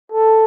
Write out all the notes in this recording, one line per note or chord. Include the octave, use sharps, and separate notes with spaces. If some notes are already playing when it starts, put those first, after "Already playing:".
A4